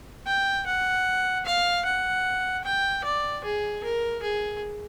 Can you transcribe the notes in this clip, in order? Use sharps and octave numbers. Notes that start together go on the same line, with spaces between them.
G5
F#5
F5
F#5
G5
D5
G#4
A#4
G#4